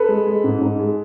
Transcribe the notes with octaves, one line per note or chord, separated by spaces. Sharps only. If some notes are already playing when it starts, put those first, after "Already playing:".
Already playing: A4 B4
G#3
G#3
G#2
G#2
G#3